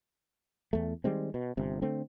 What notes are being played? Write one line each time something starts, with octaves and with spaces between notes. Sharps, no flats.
E2 A3
D#3 G3 G#3 C4
B2
G1 C3
D3 A3 C4